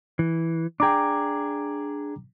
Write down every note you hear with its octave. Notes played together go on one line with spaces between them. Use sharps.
E3
D4 G#4 G5 A#5 D6